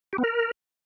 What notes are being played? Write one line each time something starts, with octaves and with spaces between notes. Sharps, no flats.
G4
B3
A#4